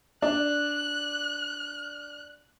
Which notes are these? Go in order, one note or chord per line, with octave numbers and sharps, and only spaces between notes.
D4 F#6